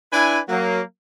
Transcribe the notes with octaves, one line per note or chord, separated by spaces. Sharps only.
D4 E4 B4 G#5
F#3 A#3